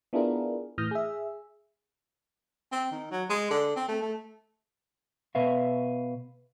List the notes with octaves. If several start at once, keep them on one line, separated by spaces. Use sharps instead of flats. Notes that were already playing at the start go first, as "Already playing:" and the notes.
B3 D4 E4 F4 G#4 A#4
A2 E3 D#6 F6 G6 A#6
G#4 E5
C4
D#3
F#3
G#3
D3
C4
A3
A3
B2 B4 E5 F5